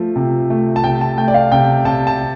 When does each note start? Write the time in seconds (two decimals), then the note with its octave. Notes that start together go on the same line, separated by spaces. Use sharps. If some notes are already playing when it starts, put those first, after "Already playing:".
Already playing: F3 A3
0.16 C3
0.50 A3
0.76 A5
0.84 C3 G5
1.01 A5
1.17 A3 G5
1.28 D5
1.34 F5
1.52 C3 G5
1.85 C3 A5
2.07 A5